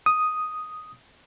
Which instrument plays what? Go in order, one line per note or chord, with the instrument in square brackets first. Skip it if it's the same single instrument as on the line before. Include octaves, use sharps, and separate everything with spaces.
[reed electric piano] D#6